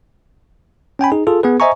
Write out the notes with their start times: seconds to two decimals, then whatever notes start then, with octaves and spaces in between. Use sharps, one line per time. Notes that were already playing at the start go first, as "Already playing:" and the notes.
0.99 C#4 G5 G#5 B5
1.12 D#4 G#4
1.27 F4 G#4 A4
1.43 B3 G#4 B4
1.60 C5 D#5 E5 G#5 A#5 C#6